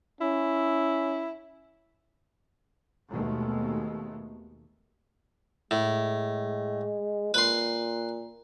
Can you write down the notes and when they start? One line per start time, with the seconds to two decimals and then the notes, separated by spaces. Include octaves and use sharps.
0.21 C#4 E4
3.09 D#2 B2 G#3 A3
5.71 A2 G#3
7.34 A#2 B4 C6